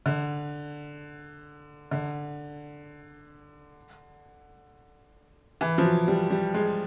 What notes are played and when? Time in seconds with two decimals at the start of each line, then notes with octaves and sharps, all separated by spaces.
0.06 D3
1.91 D3
5.61 E3
5.78 F3
5.85 F#3
6.08 G3
6.30 G3
6.54 G#3